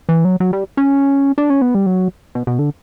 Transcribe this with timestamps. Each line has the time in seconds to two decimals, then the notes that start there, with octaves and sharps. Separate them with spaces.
0.09 E3
0.25 F#3
0.40 F#3
0.53 G3
0.77 C#4
1.38 D4
1.50 C#4
1.62 B3
1.75 G3
1.86 F#3
2.35 B2
2.47 B2
2.59 D3